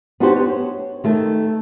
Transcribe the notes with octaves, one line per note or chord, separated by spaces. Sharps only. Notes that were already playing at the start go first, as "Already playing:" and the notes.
B3 D4 D#4 F#4 G4 C5
C#5
D#3 A3 A4